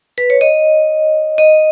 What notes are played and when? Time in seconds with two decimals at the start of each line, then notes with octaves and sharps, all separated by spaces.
0.18 B4
0.30 C#5
0.41 D#5
1.38 D#5